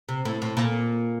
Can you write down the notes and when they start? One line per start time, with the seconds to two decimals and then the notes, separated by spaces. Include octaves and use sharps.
0.09 C3
0.25 A2
0.42 A2
0.57 A#2